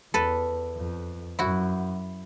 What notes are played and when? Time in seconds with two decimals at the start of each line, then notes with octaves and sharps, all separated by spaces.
0.14 E2 A4 B4
0.76 F2
1.38 F#2 E4 F#4